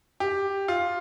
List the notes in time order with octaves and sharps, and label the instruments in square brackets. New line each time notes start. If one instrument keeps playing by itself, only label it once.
[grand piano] G4
F4